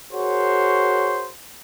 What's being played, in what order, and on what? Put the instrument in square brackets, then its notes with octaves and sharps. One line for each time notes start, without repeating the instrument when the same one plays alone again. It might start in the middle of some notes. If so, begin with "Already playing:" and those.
[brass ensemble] F#4 G#4 A#4 C5 C#5